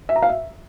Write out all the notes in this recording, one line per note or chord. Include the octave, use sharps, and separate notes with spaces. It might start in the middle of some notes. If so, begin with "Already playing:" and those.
E5
A#5
F5
E5